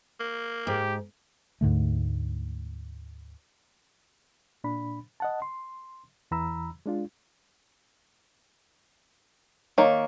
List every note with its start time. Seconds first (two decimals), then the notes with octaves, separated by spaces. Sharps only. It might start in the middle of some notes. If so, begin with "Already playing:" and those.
0.20 A#3
0.67 G#2 G4
1.61 D2 G#2 D3 A3
4.64 A#2 D4 B5
5.20 D#5 F#5 A5
5.42 C6
6.31 E2 E3 A#5 B5 E6
6.86 G#3 D4 F4
9.78 D#3 A#3 C#5